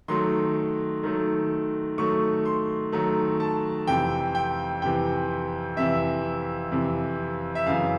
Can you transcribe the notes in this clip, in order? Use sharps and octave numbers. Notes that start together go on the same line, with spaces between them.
D#3 F#3 A3 C6
D#3 F#3 A3
D#3 F#3 A3 C#6
C6
D#3 F#3 A3 A#5
A5
F2 C3 E3 G5
G5
F2 C3 E3 G5
F2 C3 E3 E5
F2 C3 E3
E5
F#2 C#3 E3 F5